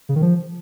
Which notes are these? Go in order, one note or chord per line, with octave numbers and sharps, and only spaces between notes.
C#3
D#3
F3